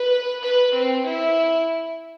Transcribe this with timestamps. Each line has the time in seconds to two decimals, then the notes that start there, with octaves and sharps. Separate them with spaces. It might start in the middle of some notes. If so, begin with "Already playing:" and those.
Already playing: B4
0.43 B4
0.74 C4
1.05 E4